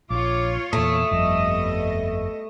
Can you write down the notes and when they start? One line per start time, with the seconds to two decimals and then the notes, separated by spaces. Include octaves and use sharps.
0.10 A#1 F4 C#5 D6
0.73 E2 A#2 A3 D#6
1.11 G1 F2 G3 B3 D#5